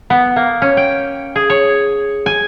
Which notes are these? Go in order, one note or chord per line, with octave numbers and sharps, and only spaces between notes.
B3
A#3
C#4
G5
G#4
C#5
G#5